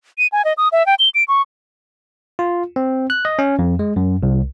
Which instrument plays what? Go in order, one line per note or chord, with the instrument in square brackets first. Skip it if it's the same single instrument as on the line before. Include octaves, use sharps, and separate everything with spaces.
[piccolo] D#7
G#5
D#5
D#6
E5
G5
G7
D7
C#6
[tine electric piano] F4
C4
F#6
D#5
C#4
F2
G#3
F#2
C2